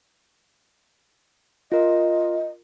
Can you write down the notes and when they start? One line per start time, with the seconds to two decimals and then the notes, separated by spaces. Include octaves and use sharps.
1.72 F4 A#4 D#5